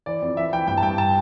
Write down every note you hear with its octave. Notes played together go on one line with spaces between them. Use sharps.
E3 D5
F2
E3 E5
E3 G5
G2 G5
A5
G2 G5
A5